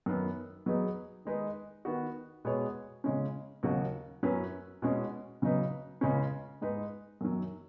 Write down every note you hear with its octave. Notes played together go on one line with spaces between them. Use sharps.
F#2 D#3 B3
F#3 B3 D#4 G#4 B4
D#3 G#3 D#4 B4
D#3 B3 F#4
B2 G#3 B3 G#4 C#5
C#3 G#3 C#4
D#2 C#3 F#3 D#4 F#4
F#2 F#3 C#4 B4
B2 G#3 C#4
C#3 F#3 D#4 B4
C#2 C#3 G#3 C#4
G#2 G#3 D#4 B4
F#2 D#3 F#3